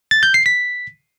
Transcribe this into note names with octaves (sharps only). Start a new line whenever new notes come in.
A6
G6
C7
B6